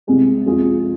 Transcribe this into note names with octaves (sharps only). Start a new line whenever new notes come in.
C2 C3 G#3 C4
F2 C3 G#3 F4 G#4